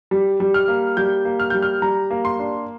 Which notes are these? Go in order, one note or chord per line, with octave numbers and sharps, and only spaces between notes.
G3
G3
F6
A#3
G3 G6
A#3
F6
G3 G6
F6
G3 A#5
A#3
C6
D4